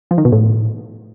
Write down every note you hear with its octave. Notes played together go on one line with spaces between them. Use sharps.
F3
D#3
B2
A2